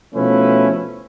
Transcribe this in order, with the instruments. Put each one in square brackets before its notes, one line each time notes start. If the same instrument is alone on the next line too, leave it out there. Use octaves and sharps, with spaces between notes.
[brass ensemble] B2 F3 A3 C#4 E4 B4